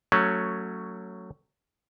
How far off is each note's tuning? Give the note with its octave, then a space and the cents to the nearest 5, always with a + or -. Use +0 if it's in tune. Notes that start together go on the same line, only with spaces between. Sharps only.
F#3 +0 A3 +20 C#4 +0